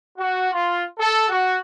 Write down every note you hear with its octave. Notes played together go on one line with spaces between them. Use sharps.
F#4
F4
A4
F#4